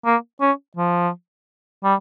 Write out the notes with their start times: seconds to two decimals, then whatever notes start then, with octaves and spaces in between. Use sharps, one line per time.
0.06 A#3
0.41 C#4
0.77 F3
1.84 G3